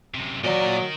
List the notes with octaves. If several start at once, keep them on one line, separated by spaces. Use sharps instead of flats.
F#2 C3
A#2 F#3 A#4 D5 D#5